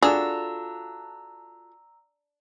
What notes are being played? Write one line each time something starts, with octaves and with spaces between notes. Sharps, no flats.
D4 F4 F#4 G#4 A4 A#5 E6